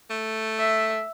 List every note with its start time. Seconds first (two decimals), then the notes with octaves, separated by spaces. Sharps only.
0.10 A3
0.59 E5